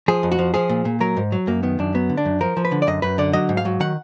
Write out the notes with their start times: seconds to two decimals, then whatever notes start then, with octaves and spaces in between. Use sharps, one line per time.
0.08 F3 G#4
0.23 F2
0.32 F#4
0.39 F3
0.54 F3 G#4
0.69 A#2
0.85 A#2
1.00 F#3 A#4
1.17 G#2
1.32 F#3
1.47 F#2 A#3
1.63 D#3 B3
1.79 F#2 D4
1.94 F#3 B3
2.09 D3
2.17 D4
2.25 F#2
2.41 F3 A#4
2.57 F3
2.65 B4
2.72 D3
2.82 D5
2.87 F#2 D#5
3.02 F#2 B4
3.18 D3 D5
3.33 F#3 D#5
3.49 G#2
3.57 F5
3.65 F#3
3.80 D#3 F#5